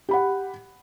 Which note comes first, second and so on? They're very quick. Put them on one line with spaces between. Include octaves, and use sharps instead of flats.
G4 B5 F#5